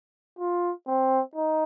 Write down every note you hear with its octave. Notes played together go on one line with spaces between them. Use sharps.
F4
C4
D#4